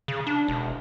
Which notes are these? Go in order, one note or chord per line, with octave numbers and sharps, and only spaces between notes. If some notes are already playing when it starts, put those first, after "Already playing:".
C#3
D4
E1